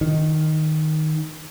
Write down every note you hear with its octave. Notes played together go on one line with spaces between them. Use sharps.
D#3